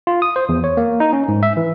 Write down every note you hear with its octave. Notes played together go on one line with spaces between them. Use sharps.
F4
D#6
C5
E2
C#5
A#3
D#4
C#4
G#2
E5
E3